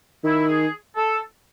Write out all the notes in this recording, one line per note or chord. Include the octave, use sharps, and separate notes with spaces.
D#3 E4
G#4
A4